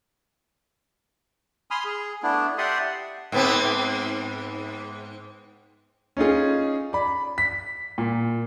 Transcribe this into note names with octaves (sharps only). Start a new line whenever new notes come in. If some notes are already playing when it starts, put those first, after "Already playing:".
G#5 B5 C6 D#6 F6
G#4
A3 B3 D4 E4
G4 D5 E5 F#5 C6 D#6
G#2 B3 C4
C#4 D#4 F4 G#4
D5 B5
B6
A#2